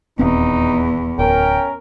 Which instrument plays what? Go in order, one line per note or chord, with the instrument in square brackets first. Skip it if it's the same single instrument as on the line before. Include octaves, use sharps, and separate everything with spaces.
[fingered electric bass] D#1 C4 [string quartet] E2 [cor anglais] D#4
[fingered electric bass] D1 [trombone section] C#4 A#4 [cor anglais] G5